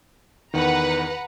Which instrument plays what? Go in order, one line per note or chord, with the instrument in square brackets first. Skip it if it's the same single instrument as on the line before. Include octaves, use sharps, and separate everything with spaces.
[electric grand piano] E2 D#3 [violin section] B4 F#5 A#5